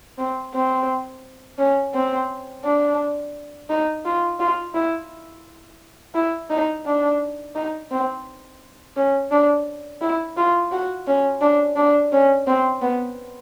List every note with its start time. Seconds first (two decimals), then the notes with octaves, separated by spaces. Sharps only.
0.18 C4
0.54 C4
1.58 C#4
1.94 C4
2.64 D4
3.70 D#4
4.05 F4
4.40 F4
4.74 E4
6.15 E4
6.50 D#4
6.86 D4
7.55 D#4
7.91 C4
8.96 C#4
9.31 D4
10.01 E4
10.37 F4
10.72 F#4
11.07 C#4
11.41 D4
11.76 D4
12.12 C#4
12.47 C4
12.82 B3